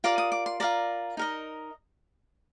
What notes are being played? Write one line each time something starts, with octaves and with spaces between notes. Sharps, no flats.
F4 A#4 D5 D6
D#6
D6
C6
F4 A#4 D5 A#5
D#4 A#4 D#5